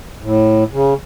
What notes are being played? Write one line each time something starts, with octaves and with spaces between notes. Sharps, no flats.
A2
C#3